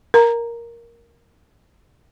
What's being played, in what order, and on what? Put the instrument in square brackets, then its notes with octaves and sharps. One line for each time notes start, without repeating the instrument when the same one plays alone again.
[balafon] A#4 A#5